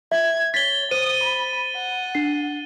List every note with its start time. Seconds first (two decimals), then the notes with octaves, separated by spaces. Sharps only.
0.12 E5 G#6
0.54 C#5 A6 B6 G7
0.91 C5 D#6 D#7
1.23 B5
1.75 F#5
2.15 D4 C7